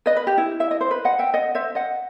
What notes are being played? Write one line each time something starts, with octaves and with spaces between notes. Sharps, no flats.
B4 D#5
B4
G4
E4
E5
D#5
C5
B4
D#5 F#5
E5 G5
D#5 F#5
C5 E5
D#5 F#5